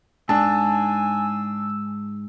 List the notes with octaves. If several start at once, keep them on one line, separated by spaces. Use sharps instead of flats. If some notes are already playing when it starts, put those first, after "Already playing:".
G#2 D4 G#5 A5 E6